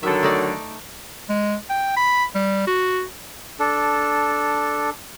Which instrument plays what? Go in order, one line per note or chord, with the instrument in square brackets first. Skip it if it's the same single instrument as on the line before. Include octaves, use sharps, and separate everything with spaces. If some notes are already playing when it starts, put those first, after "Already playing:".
[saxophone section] D3 D#3 F#3 [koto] A4 E5
[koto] A3 D#4 D5
[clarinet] G#3
G5
B5
G3
F#4
[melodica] D4 A4